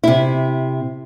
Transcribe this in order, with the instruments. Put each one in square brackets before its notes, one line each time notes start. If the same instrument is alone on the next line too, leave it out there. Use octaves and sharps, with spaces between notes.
[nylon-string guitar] C3 E4